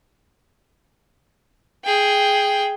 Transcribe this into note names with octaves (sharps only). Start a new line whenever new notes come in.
G#4 G5